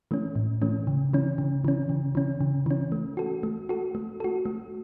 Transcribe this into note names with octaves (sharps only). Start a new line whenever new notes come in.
E3 A3 C#4
A2
E3 A3 C#4
C#3
E3 C#4
C#3
E3 C#4
C#3
E3 C#4
C#3
E3 C#4
A3
F#4 A4
A3
F#4 A4
A3
F#4 A4
A3